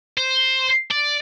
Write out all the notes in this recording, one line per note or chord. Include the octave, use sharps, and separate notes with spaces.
C5
D5